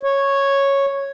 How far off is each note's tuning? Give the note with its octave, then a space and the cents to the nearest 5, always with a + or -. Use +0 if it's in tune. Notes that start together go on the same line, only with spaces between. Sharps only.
C#5 -5